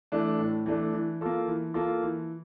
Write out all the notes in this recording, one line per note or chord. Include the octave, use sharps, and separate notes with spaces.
E3 A3 D4
A2
E3 A3 D4
E3
A#3 F4 A4
E3
A#3 F4 A4
E3